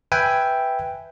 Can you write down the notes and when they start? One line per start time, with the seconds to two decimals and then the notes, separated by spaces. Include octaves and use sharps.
0.12 B4 E5 G5 G#5